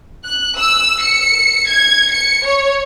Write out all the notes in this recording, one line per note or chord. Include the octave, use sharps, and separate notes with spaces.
F#6
E6
C#7
G#6
C#7
C#5